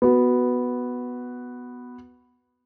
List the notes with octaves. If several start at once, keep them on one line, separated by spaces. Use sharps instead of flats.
B3 F#4